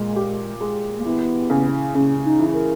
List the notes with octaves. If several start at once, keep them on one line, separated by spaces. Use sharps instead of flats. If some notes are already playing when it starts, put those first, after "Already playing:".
Already playing: A#2 G#3
G4
G#3
A#3
E3 B3
C#3
C#3 C#4
D#4
E3
A#4